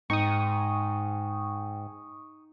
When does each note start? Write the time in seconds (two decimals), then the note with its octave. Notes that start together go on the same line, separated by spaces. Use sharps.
0.10 G#2 D#4 G5 C#6 D#6